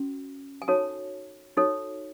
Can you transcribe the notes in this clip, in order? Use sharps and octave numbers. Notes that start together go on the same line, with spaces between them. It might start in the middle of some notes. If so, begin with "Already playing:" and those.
Already playing: C#4 F#4
G#5
D#4 F#4 A4 C#5 A5
D#4 F#4 A4 C#5